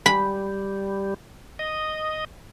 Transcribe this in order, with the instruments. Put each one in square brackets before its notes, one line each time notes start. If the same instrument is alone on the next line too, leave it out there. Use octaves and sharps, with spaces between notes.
[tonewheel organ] G3 [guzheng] B5
[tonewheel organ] D#5